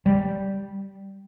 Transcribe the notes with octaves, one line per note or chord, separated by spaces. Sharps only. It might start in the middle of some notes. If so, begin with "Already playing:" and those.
G3